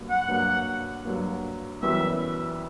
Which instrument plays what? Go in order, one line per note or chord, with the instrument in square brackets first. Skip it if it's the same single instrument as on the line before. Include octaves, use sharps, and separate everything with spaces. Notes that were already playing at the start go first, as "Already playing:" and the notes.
Already playing: [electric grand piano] G2 F#3 A#3
[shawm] F#5
[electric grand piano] G2 F#3 A#3
G2 F#3 A#3
[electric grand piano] F#2 E3 G3 B3 F#4 [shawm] E5